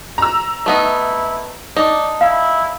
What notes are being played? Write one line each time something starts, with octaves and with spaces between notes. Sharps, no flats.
A#5 E6
A3 B3 D#4 E4
D4 D#4 D5
E4 F5